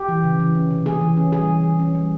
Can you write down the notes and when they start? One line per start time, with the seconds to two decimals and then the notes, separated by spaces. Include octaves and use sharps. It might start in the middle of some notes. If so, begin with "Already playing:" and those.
Already playing: G4
0.08 E3
0.24 C#3
0.39 E3
0.55 C#4
0.70 C3
0.85 A#3 G#4
1.01 E3
1.17 C#4
1.32 G3 G#4
1.48 E3
1.64 E3
1.79 C#4
1.95 G3